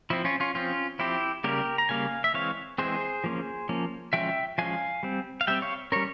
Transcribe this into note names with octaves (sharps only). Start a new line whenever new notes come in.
F3 C4 E4
C#4 F4
C#4 F4
F3 C4 C#4 F4
F3 C4 E4 G4
C#3 G3 A#3 G4 A#4
A#5
C#3 G3 A#3 F5 G#5
E5
E3 G#3 C4 C#5 F5
E3 G#3 C4 G#4 C5
F3 A#3 C#4
F3 A#3 C#4
F3 G#3 C#4 E5 G5
F3 G#3 C#4 F5 G#5
G3 C4
F5
G3 C4 E5 G5
C#5 F5
G3 C#4 A#4 C#5